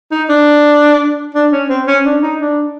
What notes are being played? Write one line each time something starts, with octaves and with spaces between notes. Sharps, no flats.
D#4
D4
D4
C#4
C4
C#4
D4
D#4
D4